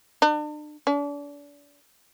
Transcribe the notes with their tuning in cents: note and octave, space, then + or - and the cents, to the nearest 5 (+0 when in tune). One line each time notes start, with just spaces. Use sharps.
D4 +40
D4 -35